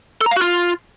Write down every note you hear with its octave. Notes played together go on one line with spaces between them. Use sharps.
A4
A#5
F5
F#4
F4